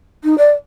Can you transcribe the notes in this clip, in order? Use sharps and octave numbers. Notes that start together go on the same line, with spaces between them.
D#4
D5